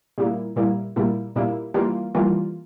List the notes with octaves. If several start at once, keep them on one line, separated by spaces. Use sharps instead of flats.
A#2 G3 A#3 E4
A#2 G3 A#3 E4
A#2 G3 A#3 E4
A#2 G3 A#3 E4
E3 G3 A#3 F4
E3 G3 A#3 F4